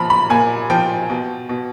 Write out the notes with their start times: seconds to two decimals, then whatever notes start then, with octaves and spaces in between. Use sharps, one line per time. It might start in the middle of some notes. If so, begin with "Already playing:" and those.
Already playing: A#2 F3 A#5 B5
0.10 B5
0.30 A#2 G#5
0.70 F3 G5
1.10 B2
1.49 B2